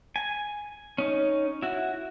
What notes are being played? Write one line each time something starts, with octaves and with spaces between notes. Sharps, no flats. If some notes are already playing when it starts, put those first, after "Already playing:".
G#5
C#4 D#4
E4 F#4